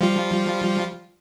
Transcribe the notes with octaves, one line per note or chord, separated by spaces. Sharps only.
F3 G3 F4